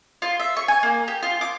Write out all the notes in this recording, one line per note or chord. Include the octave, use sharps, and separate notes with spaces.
F4
E5
C#6
G#5
A#3
G4
F4
D6